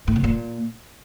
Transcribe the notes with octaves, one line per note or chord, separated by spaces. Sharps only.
A2
C3
A#2